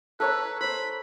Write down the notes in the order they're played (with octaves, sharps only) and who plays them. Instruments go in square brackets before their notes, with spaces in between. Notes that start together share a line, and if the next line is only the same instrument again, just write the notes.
[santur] A4 C#5 A#5 [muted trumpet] B4
[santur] C5 C6 [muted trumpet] B5